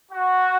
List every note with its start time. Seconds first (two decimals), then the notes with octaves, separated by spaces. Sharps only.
0.12 F#4